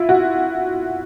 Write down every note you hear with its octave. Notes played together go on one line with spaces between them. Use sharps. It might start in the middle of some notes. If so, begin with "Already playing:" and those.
Already playing: E4 F4
F#4